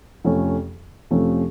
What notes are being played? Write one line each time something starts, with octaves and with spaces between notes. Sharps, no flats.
F2 C3 F3 A3 C#4
F2 C3 F3 A3 C#4